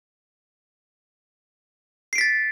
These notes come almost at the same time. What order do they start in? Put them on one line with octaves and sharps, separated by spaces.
C7 D7 B6 A6